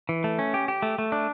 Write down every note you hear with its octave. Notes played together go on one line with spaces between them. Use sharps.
E3
A3
C#4
G4
G4
A3
A3
D4